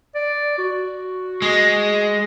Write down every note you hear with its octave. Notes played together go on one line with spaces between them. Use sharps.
D5
F#4
G#3